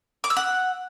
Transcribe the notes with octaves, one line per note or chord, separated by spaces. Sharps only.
D6
E6
F#5